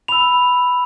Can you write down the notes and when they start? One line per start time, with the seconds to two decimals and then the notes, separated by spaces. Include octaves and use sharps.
0.08 B5 E6 F7